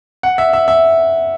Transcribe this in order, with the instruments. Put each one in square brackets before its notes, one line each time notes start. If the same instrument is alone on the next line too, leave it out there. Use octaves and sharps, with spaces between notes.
[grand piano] F#5
E5
E5
E5